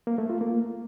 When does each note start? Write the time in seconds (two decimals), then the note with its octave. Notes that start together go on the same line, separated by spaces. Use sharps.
0.07 A#3
0.18 A3
0.29 F4
0.41 A#3